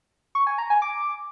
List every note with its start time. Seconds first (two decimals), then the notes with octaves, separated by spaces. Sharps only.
0.35 C#6
0.47 G#5
0.58 A#5
0.70 G#5
0.82 D6